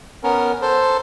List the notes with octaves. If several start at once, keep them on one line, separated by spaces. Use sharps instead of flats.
B3 C#4 A#4
A4 C5